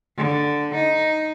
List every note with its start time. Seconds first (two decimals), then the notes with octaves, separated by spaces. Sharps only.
0.17 D3
0.75 D#4